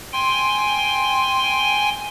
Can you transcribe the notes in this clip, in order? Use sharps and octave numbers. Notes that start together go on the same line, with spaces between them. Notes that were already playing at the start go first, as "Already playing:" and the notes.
G5 G#5 C6